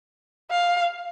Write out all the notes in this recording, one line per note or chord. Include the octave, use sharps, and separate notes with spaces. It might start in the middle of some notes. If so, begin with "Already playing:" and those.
F5